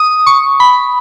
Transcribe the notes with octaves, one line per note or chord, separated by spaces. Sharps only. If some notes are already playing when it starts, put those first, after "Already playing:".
Already playing: D#6
C#6
B5